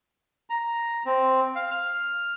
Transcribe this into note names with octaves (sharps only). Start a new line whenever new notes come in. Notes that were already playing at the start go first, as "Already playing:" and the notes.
A#5
C4
F5
F6